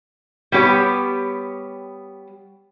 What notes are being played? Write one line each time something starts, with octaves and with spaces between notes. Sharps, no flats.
G3 B3 G4 C#5